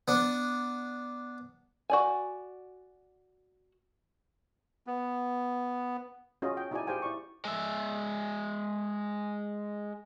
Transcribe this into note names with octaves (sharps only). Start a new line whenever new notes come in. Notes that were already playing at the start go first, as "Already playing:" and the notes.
B3 D4
F#4 D5 G#5
B3
C#4 F4 F#4 G#4 D#5
G5
D#4 E4 F#4 G#4 D5 G#5
G4 G#4 C5 F5 G5 G#5
E4 D5 C#6
G#3 E5